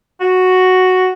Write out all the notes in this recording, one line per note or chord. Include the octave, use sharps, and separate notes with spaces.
F#4